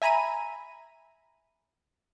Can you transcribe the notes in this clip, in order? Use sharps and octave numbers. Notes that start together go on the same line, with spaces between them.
E5 G#5 A#5 B5 D#7